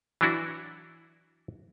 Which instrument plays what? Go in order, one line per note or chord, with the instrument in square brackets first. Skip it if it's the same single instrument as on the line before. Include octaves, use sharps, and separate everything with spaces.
[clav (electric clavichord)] E3 F#3 D4 E4 F#4